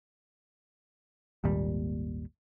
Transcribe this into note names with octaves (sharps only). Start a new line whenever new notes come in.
G#1 D#2 A#2 G3